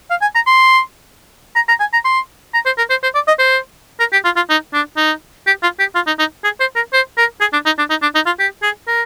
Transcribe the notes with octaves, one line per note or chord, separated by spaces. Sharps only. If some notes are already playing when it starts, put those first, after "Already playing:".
F5
G#5
A#5
C6
A#5
A#5
G#5
A#5
C6
A#5
C5
A#4
C5
C5
D5
D#5
C5
A#4
G4
F4
F4
D#4
D4
D#4
G4
F4
G4
F4
D#4
D#4
G#4
C5
A#4
C5
A#4
G#4
D4
D#4
D4
D#4
D4
D#4
F4
G4
G#4
A#4